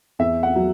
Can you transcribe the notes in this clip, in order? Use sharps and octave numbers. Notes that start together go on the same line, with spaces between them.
E2 E5
F#5
F#3